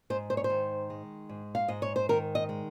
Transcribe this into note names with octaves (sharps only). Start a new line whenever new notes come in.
G#2 C5
C5
C#5
C5
D#3
G#3
G#2
F5
G#2 D#5
C#5
C5
D#3 A#4
D#5
G#3